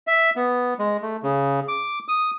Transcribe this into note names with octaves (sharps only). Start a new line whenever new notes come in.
E5
B3
G#3
A3
C#3
D6
D#6